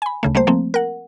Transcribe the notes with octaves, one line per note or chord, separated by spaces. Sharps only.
G#5 B5
D2 C#3 A3
G3 A3 A#3 C5
F3 A3 A#3 C4
A#4 F#5